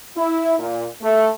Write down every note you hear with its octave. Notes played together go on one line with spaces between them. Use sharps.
E4
A#2
A3